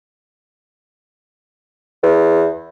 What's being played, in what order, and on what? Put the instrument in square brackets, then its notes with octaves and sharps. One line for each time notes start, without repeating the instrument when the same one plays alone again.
[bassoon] E2